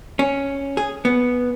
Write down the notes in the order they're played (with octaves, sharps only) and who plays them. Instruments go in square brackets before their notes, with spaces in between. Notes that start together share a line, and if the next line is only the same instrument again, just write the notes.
[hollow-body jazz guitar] C#4
G#4
B3